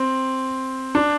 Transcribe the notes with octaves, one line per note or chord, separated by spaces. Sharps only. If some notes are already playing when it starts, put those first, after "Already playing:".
Already playing: C4
D4